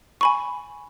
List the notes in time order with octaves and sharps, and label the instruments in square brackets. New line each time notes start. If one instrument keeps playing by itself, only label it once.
[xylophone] G#5 B5 C#6